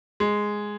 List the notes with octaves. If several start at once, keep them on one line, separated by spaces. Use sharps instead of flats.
G#3